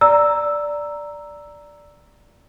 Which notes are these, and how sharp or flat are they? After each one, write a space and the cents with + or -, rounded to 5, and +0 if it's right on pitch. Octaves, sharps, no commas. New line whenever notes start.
D5 +0 A#5 +0 E6 +0